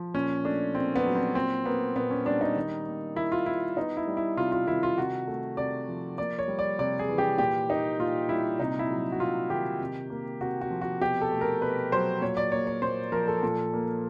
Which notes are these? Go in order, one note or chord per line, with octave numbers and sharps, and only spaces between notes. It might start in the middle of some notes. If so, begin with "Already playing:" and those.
Already playing: F3
A#2 C#4
A3 D4
A#2 C4
B3
F#3
C4
A#2 C4
A#3 B3
A#2 B3
C#4
G3 D4
D#4
D#3
A#3
D#3 E4
F4
G3 E4
B3 D#4
E4
G3
E4
C3 F4
F4
D#3 E4
F4
C3 F#4
A3
C3 D5
F3
A#3 D5
C#5
G3
D5
C3 D5
G#4
E3
G4
A#2 G4
A#3 D#4
A#2 F4
G3 E4
C3 D#4
E4
F#3
F#4
C3 F4
D#3 G4
C3
A#3
C3 F#4
F#4
F3
F#4
B2 G4
A4
A3
A#4
B2 B4
F#3 C5
A#2 C#5
D5
A#3 C#5
C#5
A#2 C5
F3 A#4
A4
A#2 A4
A#3